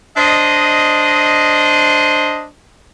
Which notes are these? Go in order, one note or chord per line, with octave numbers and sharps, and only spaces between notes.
D4 C5 D#5